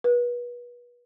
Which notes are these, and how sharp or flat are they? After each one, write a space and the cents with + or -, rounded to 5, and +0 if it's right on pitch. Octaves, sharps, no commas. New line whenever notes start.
B4 -35